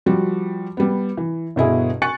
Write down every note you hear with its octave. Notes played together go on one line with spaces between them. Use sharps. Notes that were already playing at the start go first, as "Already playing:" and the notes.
F3 G3 F#4
G3 B3
E3
G1 B2 E4 G#4
G#5 C#6 F#6 A6 C#7